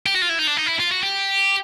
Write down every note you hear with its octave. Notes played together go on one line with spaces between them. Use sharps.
G4
F#4
F4
E4
D#4
D4
D#4
E4
F4
F#4
G4